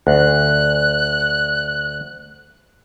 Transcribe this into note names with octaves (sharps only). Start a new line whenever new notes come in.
D2 F#6